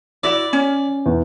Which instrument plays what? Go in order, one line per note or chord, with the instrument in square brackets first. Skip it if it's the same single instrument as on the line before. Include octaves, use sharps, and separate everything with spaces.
[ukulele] E4 F#4 [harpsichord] D5
[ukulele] C#4
[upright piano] E2